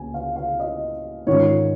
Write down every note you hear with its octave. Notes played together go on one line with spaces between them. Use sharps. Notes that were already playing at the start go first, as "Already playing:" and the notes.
Already playing: C#2 C#3 A#3 G#5
F5
F5
D#5
G#2 D#3 C#4 F4 C#5